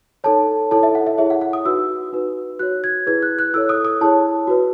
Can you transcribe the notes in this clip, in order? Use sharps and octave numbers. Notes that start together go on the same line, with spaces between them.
D#4 A4 C#5 A5
E4 A4 C#5 A5
E5
F#5
E5
E4 G#4 C#5 E5
F#5
F#5
D#6
D#4 F#4 B4 E6
D#4 F#4 B4
F#4 C#5 F#6
G#6
E4 G#4 B4 G#6
F#6
F#6
E4 A4 C#5 E6
D#6
D#6
E4 G#4 C#5 A5
F#4 B4